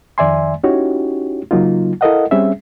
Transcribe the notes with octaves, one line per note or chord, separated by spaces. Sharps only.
F2 D#3 D5 E5 G#5 C6
C#4 D#4 E4 F#4 G4 C#5
C#3 F#3 A#3 D#4 F4
E4 A4 A#4 D#5 F5 F#5
G3 C4 C#4 G#4 E5